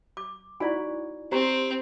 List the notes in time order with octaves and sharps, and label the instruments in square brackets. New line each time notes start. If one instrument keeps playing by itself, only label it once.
[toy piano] D6
[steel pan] D#4 F#4 B5 [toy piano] E4 D5 G#5
[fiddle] C4 [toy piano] G4 A#5 [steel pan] C5